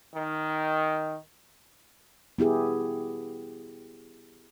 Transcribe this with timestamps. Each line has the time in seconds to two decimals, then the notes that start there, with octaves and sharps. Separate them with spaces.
0.15 D#3
2.38 B3 E4 G4 G#4